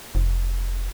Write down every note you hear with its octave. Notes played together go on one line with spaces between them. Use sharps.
F1